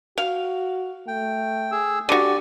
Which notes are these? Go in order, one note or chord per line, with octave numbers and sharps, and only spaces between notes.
F#4 F5
A3 G5
G#4 E6
D3 F#4 G4 D5